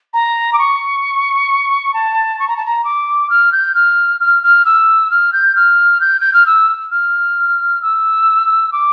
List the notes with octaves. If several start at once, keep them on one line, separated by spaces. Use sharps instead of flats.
A#5
D6
C#6
A5
C#6
A#5
A5
A#5
D6
F6
G6
F6
F6
F6
E6
F6
G6
F6
G6
G6
F6
E6
F6
E6
D6